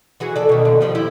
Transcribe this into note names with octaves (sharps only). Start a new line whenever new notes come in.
E3 F#4 G#4
A4 D5
B2 D#3
D#2 A#2 D3
D#3 F3 G3
E4 G4